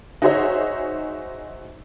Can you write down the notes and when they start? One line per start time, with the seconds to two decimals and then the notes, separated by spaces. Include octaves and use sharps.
0.22 D#4 F#4 G#4 C5 C#5 E5